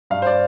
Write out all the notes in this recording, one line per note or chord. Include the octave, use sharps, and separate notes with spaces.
G2 F5
C5
D5